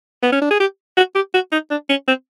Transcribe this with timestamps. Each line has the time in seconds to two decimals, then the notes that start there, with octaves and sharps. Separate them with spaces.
0.23 B3
0.32 C#4
0.41 D4
0.51 G#4
0.60 G4
0.97 F#4
1.15 G4
1.34 F#4
1.52 D#4
1.71 D4
1.89 C#4
2.08 C4